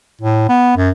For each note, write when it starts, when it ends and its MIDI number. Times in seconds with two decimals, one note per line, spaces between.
0.21 0.46 45
0.49 0.75 59
0.77 0.90 42